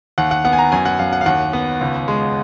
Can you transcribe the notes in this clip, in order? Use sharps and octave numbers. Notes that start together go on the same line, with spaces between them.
D#2 F#5
F#5
B3 F#5
G#5
A#5
F#2 G#5
F#5
F#2 F5
F#5
F5
D#2 F#5
B3
C#2
G#3